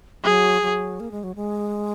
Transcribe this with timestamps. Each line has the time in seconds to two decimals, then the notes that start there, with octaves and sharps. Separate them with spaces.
0.24 F#3 G#4
0.62 F#3
1.00 A#3
1.11 G#3
1.24 F#3
1.35 G#3